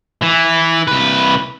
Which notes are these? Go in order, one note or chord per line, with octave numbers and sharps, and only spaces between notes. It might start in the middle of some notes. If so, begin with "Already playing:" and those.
E3
C2 B4